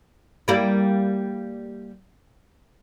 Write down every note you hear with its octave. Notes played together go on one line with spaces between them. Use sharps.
G3 A#3 E4